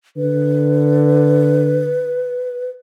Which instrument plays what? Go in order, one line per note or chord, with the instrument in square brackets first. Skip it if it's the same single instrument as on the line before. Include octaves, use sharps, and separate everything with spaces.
[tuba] D3 [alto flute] B4